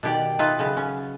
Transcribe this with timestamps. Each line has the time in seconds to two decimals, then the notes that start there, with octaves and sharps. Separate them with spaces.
0.03 B2 D#3 G4 D5 G5
0.39 D#4 F4 B4 E5 F5
0.59 C#3 F#3 B3
0.77 C#4